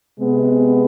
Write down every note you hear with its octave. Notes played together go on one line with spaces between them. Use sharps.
C3 G#3 B3